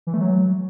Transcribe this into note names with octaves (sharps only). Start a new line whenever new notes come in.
E3
A3
F#3